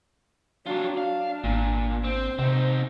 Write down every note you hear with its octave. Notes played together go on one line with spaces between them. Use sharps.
F#3 D4 F4 G4
D4 F5
G#1 A#2
C4 C5
C3 C4 D#4